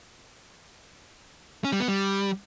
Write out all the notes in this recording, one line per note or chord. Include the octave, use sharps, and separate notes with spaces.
C#4
G3
B3
G3